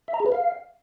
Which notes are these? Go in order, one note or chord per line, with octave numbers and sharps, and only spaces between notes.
E5
A#5
G#4
B4
F5